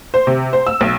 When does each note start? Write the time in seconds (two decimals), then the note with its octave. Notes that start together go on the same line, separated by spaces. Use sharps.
0.14 C5
0.27 C3
0.53 C5
0.67 E6
0.81 B1